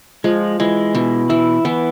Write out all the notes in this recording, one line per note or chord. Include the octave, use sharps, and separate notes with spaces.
F3 G#3
E3 G#3
B2 E3
E3 E4
E3 B3